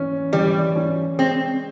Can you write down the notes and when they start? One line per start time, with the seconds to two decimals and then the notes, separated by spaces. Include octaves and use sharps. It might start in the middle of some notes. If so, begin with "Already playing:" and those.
Already playing: E3 C#4
0.32 E3 G3
0.76 C#4
1.19 G#3 C4